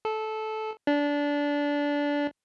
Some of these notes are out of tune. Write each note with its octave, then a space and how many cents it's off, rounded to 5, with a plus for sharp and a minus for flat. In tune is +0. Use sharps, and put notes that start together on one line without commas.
A4 -15
D4 -20